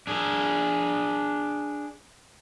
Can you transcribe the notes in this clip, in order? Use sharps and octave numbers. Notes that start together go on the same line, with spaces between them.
D4 G#4